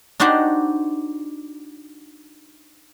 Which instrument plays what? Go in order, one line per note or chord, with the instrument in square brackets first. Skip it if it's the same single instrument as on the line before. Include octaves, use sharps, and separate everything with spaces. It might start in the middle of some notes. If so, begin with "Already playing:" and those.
[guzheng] D4 D#4 F#4 G4 C5 F#5